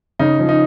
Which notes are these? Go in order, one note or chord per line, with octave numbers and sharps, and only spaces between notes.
C#3 D#4
F3
D#4